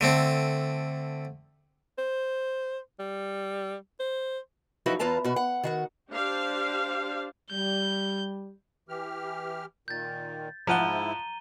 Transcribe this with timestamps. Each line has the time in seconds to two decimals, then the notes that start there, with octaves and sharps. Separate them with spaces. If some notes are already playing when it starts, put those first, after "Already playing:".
0.01 D3 A3 C4
1.98 C5
2.99 G3
4.00 C5
4.86 F#2 F3 D#4 E4 F#4 B4
4.99 E2 F4 B4 A5 A#5
5.24 B2 F#4
5.36 F#5
5.63 D#3 F#4 F#5
6.11 D4 G4 C5 F5
7.51 G3 G6
8.89 E3 G4 F6
9.88 A#2 D#3 G6 A6
10.67 G#2 F3 E4 F#5 A#5 D#7 G7